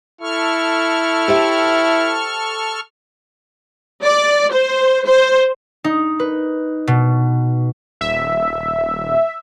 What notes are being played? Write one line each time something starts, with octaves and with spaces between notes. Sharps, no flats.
E4 A4 C#6 F6
G4 C5 E5
D5
C5
C5
D#4
B4
B2
D#1 E5